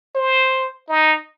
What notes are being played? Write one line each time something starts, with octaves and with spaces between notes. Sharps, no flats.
C5
D#4